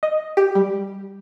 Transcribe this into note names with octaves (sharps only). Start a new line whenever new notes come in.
D#5
G4
G3